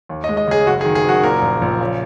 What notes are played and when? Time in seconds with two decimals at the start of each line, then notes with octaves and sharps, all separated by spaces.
0.09 D#2
0.24 D#5
0.29 G#3
0.37 D#5
0.48 C#3 G#4
0.66 F#1 F#4
0.81 G#4
0.85 D#3
0.95 G#4
1.05 F#1 F#4
1.23 A#2 A#4
1.42 A#1
1.62 A#1
1.81 C#3